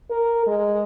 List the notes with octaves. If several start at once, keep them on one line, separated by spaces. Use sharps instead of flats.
A#4
G#3